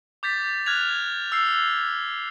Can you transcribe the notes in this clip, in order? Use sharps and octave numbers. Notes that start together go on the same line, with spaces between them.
D6 G6 A6 B6
F6 F#6 G#6 F7
E6 C7